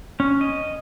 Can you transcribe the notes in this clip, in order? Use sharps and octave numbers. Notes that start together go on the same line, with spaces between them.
C#4
D#5